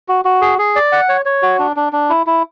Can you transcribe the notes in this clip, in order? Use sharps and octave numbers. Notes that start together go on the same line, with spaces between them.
F#4
F#4
G#4
G#4
D5
F#5
C#5
C#5
F#4
D4
D4
D4
E4
E4